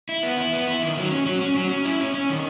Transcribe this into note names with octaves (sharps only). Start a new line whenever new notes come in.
E4
B3
E4
B3
E4
D#3
F#3
C#4
F#3
C#4
F#3
C#4
E4
C#4
C#4
D#3